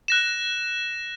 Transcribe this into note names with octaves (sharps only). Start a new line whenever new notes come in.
F#6 A#6 E7